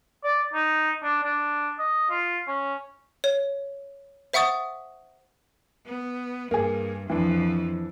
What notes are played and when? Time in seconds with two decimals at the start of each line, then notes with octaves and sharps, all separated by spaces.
0.24 D5
0.53 D#4
1.03 D4
1.23 D4
1.79 D#5
2.10 F4
2.47 C#4
3.24 C#5
4.33 C5 E5 F#5 C#6 D#6 A6
5.86 B3
6.51 G2 A#3 G#4
7.10 F2 E3 F3 D4